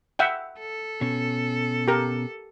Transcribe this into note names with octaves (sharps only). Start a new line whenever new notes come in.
E5 F#5 G5
A4
B2 C#4
G4 A#4